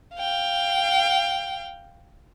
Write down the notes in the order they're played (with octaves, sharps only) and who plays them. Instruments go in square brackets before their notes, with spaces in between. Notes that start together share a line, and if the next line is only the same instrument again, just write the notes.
[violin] F5 G5